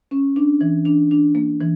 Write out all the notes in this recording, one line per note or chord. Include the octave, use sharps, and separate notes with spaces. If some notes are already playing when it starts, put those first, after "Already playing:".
C#4
D4
E3
D4
D4
A#3
E3